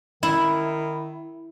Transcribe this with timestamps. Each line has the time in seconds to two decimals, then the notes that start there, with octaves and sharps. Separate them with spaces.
0.23 D#3 E4